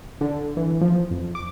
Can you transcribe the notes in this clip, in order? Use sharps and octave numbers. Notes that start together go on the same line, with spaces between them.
D3
E3
F3
F2
D6